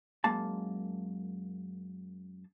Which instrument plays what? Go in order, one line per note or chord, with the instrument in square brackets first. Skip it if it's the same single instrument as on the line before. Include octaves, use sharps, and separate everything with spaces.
[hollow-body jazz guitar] F#2 G#3 A#3 A5